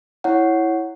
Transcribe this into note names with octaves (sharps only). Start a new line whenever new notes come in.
E4 C#5 F#5